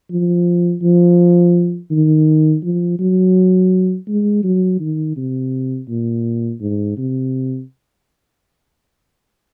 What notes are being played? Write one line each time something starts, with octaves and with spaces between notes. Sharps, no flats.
F3
F3
D#3
F3
F#3
G#3
F#3
D#3
C3
A#2
G#2
C3